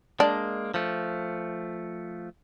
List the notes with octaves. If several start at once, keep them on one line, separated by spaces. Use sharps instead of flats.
G#3 A#3 D4
F3 A3